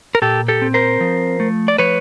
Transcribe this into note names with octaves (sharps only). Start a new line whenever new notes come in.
A#4
A#2 G4 A4
G4 A4
C4
A#4 C5
F3
A3
D5
F3 B4 C#5